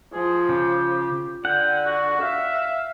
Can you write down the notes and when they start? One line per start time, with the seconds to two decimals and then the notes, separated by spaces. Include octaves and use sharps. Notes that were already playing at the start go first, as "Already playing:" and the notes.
0.13 F3 G#4
0.49 C#3 G4
1.45 D3 F#5 G5
1.86 F#4
2.21 E5 F5